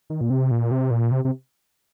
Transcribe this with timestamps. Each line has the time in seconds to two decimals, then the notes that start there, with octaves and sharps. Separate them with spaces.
0.10 D#3
0.21 A#2
0.30 C3
0.51 A#2
0.71 C3
0.91 A#2
1.11 C3
1.25 C3